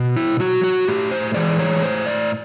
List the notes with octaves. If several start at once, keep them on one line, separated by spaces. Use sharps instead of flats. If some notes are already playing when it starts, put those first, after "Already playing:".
Already playing: B2
E4
F#3 F#4
F#4
A2 G4
C5
E3 G#3 D5
C#5
A2 C5
D5